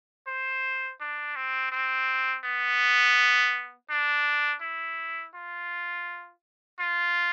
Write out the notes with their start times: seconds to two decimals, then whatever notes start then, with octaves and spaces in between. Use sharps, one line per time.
0.27 C5
1.00 D4
1.36 C4
1.72 C4
2.44 B3
3.90 D4
4.61 E4
5.35 F4
6.79 F4